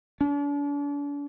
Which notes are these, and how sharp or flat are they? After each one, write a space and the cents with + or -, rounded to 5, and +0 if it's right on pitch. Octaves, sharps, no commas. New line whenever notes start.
D4 -40